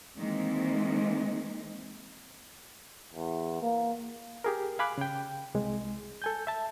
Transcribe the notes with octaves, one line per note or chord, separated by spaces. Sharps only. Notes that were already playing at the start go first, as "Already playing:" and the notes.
D#3 E3 G#3 A#3 C4
E2
A#3
G4 G#4 A#4
F5 G#5 B5 D6 F#6
C#3 G5
C2 G#3
A4 G#5 G6
E5 A5